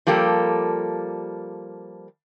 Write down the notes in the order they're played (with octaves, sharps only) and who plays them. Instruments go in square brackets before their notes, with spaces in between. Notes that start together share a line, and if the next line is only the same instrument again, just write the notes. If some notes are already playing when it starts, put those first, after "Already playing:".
[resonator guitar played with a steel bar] F3 G3 A#3 G4 A4